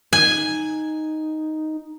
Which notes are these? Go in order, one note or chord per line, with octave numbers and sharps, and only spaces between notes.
D#4 G#5